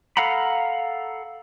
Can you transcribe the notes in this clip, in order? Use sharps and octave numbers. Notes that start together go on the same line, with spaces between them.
A4 F5 F#5 A#5 B5